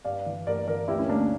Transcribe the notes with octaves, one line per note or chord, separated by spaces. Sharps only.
G2 D5 F5
E3
G2 A#4 D5
E3 A#4 D5
D2 E4 G4
C#4 E4
D2 A#3 D4
C#4